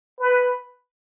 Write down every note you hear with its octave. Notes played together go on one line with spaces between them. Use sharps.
B4